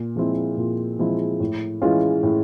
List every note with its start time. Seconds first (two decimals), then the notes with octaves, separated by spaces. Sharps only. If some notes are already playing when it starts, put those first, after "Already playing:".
Already playing: A#2
0.16 F3 G#3 C4 E4
0.57 A#2
0.99 F3 G#3 C4 E4
1.40 A2
1.82 E3 G#3 C#4 F4
2.23 A2